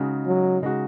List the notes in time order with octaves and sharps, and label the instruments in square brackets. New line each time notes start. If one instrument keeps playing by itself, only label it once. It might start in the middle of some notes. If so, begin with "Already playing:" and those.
Already playing: [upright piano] C#3 G#3 D#4 F#4
[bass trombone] F#3
[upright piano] C#3 G#3 D#4 F#4